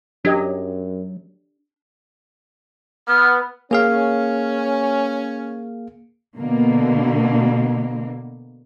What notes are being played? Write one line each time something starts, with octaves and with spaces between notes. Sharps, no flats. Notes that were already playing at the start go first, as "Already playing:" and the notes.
F#2 F#3 D4 G4 D#5
B3 F6
A#3 C#4 G#4 F5
B2 D3 A#3